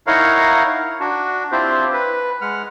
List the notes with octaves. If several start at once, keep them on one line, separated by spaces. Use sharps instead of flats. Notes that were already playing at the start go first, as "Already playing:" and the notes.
D#4 E4 A#4 C#5 F5 F#5
D4 F#4
C4 D4 E4 F4 G4 C5
B4
G#3 F#5 F6